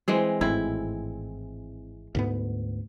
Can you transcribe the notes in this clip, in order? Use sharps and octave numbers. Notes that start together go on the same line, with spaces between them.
E3 G#3 C4
G#1 A2 C4 E4
D2 G#2 B3